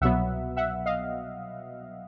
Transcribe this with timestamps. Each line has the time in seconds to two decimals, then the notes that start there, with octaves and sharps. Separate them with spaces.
0.01 C2 B2 F#3 B3 E5 F#5
0.57 E5 F#5
0.86 D#5 F5